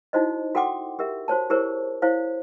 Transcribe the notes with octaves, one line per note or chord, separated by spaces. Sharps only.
D#4 E4 F#4 C5 D#5
F#4 A4 F#5 G5 C6 D6
G4 A#4 E5
F#4 C5 C#5 A5
E4 G4 G#4 A#4 C5 C#5
E4 C5 C#5 F5